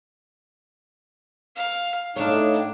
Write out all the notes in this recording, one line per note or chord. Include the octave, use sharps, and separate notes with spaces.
F5
A2 D4 D#4 C#5 F5